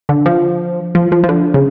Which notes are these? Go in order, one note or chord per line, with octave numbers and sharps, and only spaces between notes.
D3
F3
F3
F3
F3
D3
C#3